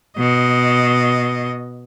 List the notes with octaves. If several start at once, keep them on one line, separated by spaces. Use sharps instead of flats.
B2 D#5